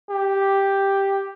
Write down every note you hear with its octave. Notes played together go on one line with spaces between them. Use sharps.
G4